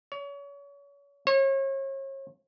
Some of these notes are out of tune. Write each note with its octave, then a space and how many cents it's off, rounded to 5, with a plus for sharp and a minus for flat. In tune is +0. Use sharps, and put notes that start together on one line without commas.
C#5 +35
C#5 -35